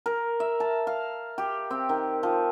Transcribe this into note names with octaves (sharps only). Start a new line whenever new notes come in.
A#4
E5
A5
F5
G4
C4
D#3
F3